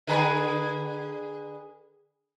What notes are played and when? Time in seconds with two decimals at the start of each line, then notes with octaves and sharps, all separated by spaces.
0.07 D3 G#4 B4